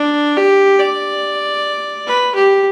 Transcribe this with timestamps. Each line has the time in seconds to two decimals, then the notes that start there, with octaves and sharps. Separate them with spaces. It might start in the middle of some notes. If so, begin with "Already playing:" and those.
Already playing: D4
0.37 G4
0.79 D5
2.07 B4
2.35 G4